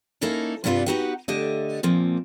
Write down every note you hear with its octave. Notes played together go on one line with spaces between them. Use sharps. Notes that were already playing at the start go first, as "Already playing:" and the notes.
A#3 C#4 D#4 E4 A4 A#4
G2 C3 G3 B3 F4 D5
B3 D#4 F#4 G4 E5 F#5
D3 A3 G4 D#5 E5
A#2 F3 A#3 C4